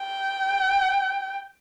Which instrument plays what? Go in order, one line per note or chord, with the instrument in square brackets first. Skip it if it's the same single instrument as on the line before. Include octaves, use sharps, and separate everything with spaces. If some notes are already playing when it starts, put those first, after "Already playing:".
Already playing: [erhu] G5